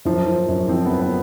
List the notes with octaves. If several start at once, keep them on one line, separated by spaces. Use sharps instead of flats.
F#2 F3
F3
F#2
F3 C4
F#2 B3
B3